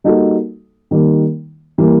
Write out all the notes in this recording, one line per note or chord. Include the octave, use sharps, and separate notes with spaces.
G3 A#3 D#4 F#4 A4
D#3 G3 A#3
E3 G3 A#3